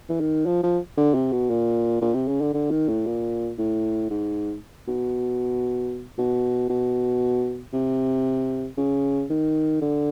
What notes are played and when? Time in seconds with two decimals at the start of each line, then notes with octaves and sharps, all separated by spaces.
0.09 E3
0.20 D#3
0.46 F3
0.63 F3
0.98 D3
1.15 C3
1.32 B2
1.50 A#2
2.01 A#2
2.15 C3
2.28 C#3
2.41 D3
2.54 D3
2.71 D#3
2.88 A2
3.06 A#2
3.58 A2
4.10 G#2
4.88 B2
6.18 B2
6.69 B2
7.73 C3
8.78 C#3
9.30 D#3
9.82 D3